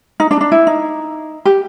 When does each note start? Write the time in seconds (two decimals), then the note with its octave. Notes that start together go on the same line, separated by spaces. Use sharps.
0.20 D#4
0.31 D4
0.41 D4
0.52 E4
0.67 D#4
1.45 G4